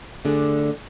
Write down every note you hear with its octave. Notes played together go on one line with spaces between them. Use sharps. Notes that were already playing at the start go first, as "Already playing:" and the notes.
D3 A3 D4 G#4 D5